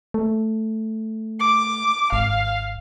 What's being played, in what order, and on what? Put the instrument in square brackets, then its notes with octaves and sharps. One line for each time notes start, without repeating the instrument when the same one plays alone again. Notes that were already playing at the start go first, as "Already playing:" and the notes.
[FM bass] A3
[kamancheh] D6
[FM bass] G#1 [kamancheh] F5